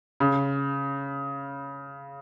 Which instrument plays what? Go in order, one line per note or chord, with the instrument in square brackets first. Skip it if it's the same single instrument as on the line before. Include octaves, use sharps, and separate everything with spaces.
[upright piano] C#3